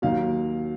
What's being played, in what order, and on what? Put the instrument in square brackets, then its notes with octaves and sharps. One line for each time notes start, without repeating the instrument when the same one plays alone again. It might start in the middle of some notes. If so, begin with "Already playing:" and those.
[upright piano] D#2 D#3 F#3 F5